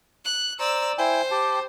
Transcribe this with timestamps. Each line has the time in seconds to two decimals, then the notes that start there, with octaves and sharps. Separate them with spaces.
0.25 F#6
0.60 C5 D5 A#5 E6
0.98 E4 C5 G5 G#5
1.31 G4 G5 A5